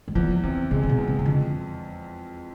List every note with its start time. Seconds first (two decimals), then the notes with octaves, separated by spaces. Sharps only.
0.08 G#3
0.15 E2 F3
0.43 C3 E3
0.71 C3 G#3
0.83 C3
0.89 B2
0.99 E2
1.08 C3
1.19 C3
1.26 F2 D3